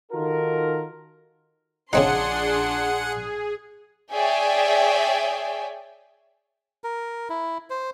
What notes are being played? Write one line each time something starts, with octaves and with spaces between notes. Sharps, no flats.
D#3 D#4 F4 F#4 A4 A#4
A#1 C#3 C4 D4 D#4 G#4 F#5 C6
G#4 C#5 D5 E5 G5 G#5
A#4
E4
C5